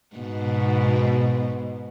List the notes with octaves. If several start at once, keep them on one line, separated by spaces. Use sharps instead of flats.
G#2 B2